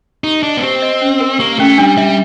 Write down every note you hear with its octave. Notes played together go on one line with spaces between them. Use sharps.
D#4 G4
D4 D#5
B3
C4 G4
D#5
C#4
A#4
A#3 G4
A3 C#4
G3 D4
G3 E5